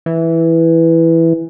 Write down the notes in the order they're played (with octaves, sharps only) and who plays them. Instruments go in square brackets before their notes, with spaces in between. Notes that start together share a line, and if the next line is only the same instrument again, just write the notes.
[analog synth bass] E3